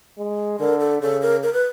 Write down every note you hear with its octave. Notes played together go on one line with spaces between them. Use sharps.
G#3
D3 A#4
A4
C#3 A4
A#4
A#4
B4